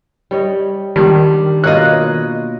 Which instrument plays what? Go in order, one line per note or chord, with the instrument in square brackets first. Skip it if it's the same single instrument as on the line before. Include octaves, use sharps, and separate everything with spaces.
[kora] G3 C#5 D#5
[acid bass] D#3 [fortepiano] G3 [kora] D4
[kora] B2 A#3 F4 [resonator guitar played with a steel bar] C#5 D#5 [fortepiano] F#6